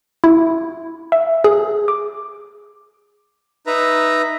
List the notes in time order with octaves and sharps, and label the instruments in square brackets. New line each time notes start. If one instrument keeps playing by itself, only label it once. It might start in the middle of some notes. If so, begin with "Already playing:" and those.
[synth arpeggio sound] E4
E5
G#4
D6
[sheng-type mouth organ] D#4 B4 E5 A#5